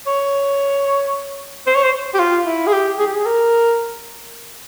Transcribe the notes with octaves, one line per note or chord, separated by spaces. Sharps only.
C#5
C5
C#5
C5
G4
F4
E4
G#4
G4
G#4
G4
G#4
A#4